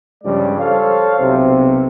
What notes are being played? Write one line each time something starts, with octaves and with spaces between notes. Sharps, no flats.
G2 C#3 F3 G3 G#3 D5
A4 C5 C#5 F5
B1 C3